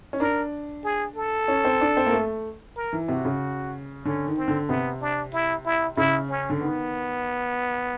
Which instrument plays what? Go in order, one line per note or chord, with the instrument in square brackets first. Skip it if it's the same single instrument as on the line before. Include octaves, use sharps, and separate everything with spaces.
[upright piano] C#4
[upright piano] D4 [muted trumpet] A#4
[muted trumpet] G#4
A4
[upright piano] C#4
C4
D4
C4
A#3
A3
[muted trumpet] A#4
[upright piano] E3
[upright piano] C3 [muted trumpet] F#4
[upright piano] C#3
[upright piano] D3 [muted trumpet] C#4
[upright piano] D#3
[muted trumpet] C4
[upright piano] D3
[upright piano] C3 [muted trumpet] B3
[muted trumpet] D4
E4
E4
[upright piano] C#3 [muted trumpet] E4
[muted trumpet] C#4
[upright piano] D3
[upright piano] D#3 [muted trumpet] B3